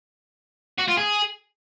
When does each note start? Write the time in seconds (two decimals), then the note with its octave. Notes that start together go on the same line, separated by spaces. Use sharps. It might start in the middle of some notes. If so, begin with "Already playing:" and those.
0.78 F#4
0.88 F4
0.97 G#4